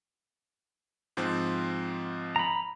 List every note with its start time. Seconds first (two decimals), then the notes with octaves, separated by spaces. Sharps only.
1.17 G#2 F3 C4
2.36 A#5 B5